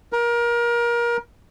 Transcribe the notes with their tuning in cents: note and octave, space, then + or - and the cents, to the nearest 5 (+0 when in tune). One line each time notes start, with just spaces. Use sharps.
A#4 +25